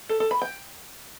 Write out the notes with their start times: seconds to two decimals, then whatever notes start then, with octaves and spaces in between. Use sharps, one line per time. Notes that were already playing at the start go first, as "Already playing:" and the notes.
0.09 A4
0.20 A4
0.31 B5
0.42 G5